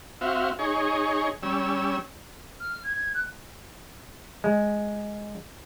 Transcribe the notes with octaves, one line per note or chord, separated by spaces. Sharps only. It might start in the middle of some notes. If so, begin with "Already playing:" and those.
C4 F#4 E5 F5
D#4 G#4 C#5
G3 C#4 E6
F6
G#6
F#6
G#3